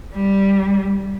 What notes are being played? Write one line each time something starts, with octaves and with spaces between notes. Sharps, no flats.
G3